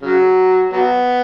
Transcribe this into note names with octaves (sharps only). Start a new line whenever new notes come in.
C#3 F#3
F#3 B3